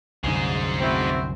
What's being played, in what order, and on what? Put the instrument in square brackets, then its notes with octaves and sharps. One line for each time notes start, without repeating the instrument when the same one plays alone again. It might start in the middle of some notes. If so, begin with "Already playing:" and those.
[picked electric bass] C2 F#2 D3 [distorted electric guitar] G#4 C5
[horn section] C4 E4 F#4